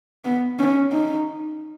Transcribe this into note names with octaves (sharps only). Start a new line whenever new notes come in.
B3
C#4
D#4